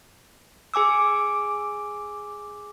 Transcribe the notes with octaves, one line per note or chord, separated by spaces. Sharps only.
G#4 G#5 D6 E6